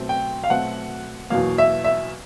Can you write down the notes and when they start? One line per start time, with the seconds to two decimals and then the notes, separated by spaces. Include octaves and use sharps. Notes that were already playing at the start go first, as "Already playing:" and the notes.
Already playing: B2 F#3 A3 C4
0.09 G5
0.44 F5
0.50 B2 F#3 A3 C4 F#5
1.30 E2 B2 F#3 A#3 F5
1.58 E5
1.84 E5